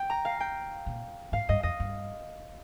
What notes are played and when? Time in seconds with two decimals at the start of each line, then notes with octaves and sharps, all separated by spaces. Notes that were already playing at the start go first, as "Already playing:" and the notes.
Already playing: G5
0.10 A#5
0.25 F5
0.40 G5
0.86 A#2
1.32 G#2 F5
1.49 G2 D#5
1.63 F2 D#5
1.80 G2